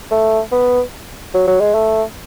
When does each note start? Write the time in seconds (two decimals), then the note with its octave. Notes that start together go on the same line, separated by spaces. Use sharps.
0.11 A3
0.52 B3
1.34 F#3
1.47 F#3
1.60 G#3
1.74 A3